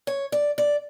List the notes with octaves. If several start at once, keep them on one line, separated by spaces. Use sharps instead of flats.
C#5
D5
D5